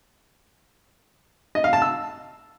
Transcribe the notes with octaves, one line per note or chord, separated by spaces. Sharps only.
D#5
F5
A5
E6